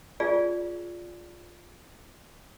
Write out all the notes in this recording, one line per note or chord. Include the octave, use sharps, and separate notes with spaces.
F4 G#4 D5